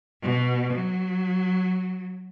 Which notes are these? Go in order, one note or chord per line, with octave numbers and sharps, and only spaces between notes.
B2
F#3